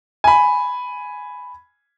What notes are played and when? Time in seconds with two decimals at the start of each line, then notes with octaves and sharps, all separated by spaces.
0.24 G#5 B5